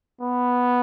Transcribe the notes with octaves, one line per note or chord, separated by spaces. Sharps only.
B3